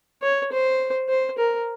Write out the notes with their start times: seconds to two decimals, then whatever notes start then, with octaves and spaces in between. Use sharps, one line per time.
0.22 C#5
0.52 C5
1.09 C5
1.38 A#4